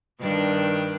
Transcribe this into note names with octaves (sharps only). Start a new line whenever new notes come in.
G2 D#3 D4